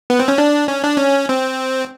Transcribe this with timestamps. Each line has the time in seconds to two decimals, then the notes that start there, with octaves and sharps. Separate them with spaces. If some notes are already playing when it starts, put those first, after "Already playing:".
0.10 B3
0.19 C4
0.28 C#4
0.38 D4
0.68 C#4
0.83 D4
0.96 C#4
1.29 C4